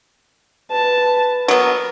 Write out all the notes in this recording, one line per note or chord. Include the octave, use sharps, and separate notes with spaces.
B4 A5
F#3 B3 A#4